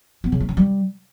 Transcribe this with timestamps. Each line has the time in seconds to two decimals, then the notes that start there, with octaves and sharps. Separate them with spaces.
0.24 B3
0.32 C#3
0.40 A3
0.49 C#4
0.57 G3